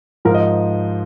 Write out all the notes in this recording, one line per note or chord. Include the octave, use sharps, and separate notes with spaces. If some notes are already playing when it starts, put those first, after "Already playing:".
G#2 F3 A#4
D#5